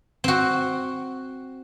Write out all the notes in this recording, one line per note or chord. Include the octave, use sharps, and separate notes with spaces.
C4 F#4